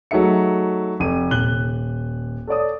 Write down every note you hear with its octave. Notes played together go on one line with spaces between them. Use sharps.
F#3 A3 D#4 G#4 E5 C#7
F1 D#7
D#1 F#6 G7
A4 C#5 D5 D#6